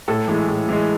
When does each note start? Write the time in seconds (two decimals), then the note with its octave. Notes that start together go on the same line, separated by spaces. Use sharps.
0.08 A2 A4
0.28 E3 G#3
0.48 A2
0.69 E3 G#3